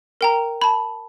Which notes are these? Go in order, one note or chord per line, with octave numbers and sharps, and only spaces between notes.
A#4 G5 A#5
A5 B5